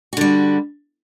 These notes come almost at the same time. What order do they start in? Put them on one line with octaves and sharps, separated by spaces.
F#4 D3 G3